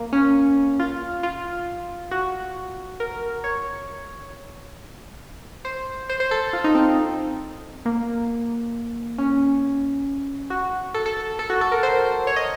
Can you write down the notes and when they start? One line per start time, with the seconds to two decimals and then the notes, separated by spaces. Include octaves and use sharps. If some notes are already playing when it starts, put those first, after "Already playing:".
Already playing: A#3
0.13 C#4
0.79 F4
1.23 F4
2.11 F#4
3.00 A#4
3.44 C#5
5.65 C5
6.10 C5
6.20 C5
6.31 A4
6.53 F4
6.64 D#4
6.75 C4
7.85 A#3
9.18 C#4
10.50 F#4
10.94 A4
11.06 A4
11.39 A4
11.50 F#4
11.61 A4
11.72 A#4
11.83 C5
12.27 C#5
12.36 D#5